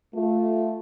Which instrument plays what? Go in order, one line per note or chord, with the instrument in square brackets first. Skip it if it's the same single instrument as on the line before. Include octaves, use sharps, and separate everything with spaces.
[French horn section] A3 F4